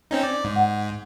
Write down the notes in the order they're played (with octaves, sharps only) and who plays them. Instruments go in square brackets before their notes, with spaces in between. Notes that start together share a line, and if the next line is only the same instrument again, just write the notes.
[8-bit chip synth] C4 C#4 D#4
D5
G#2
[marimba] F#5